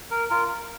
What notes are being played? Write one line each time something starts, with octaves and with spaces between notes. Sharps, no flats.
A#4
F4 A#4